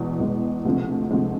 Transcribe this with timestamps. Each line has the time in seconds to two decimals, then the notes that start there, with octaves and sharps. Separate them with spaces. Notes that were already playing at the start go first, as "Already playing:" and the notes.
Already playing: E2 B2 G#3
0.20 E2 B2 G#3
0.65 D2 C3 F3 G#3 C4
1.11 D2 C3 F3 G#3 C4